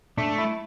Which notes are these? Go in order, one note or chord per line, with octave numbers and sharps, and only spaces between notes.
A3 D4
E4